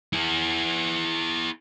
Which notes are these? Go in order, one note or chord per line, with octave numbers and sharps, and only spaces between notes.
E4 G#4